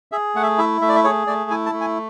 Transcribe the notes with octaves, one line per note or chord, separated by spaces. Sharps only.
G#4 E5
A3 F#5
E5
E4 E5
A3 E5
D5
E5
G#4 C#5
A3 D5
E4 G#5
A5
A3
G#5